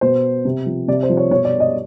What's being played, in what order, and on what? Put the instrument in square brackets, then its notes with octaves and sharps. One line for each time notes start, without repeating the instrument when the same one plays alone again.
[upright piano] B2 C5
C3
F3
C3 D5
C5
F3
C#5
B2 C#5
D5
D#5